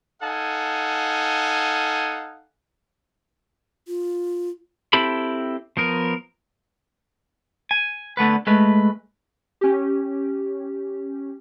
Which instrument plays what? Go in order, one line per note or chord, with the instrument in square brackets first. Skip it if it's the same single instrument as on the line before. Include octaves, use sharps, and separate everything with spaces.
[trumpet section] D#4 A4 F5 F#5 G#5
[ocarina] F4
[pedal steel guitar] C4 E4 G4 A4 B5
F3 B3 A#4
[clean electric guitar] G#5
D3 A3 B3 B4
G#3 A3 B4
[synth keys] C#4 G4